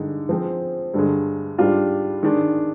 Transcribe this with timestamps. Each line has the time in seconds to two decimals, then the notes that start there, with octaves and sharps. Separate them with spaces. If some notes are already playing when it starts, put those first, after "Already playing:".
Already playing: G2 D3 G#3 D#4
0.29 F3 G#3 C4
0.94 G2 D3 G#3
1.58 G#2 G3 D4 F4
2.23 D#3 G#3 D4